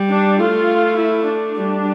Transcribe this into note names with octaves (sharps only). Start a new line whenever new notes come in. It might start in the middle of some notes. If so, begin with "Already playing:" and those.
Already playing: G3
D4
A3 F4
E4
D4
G3